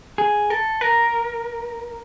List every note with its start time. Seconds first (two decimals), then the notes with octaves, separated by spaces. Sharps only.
0.18 G#4
0.50 A4
0.81 A#4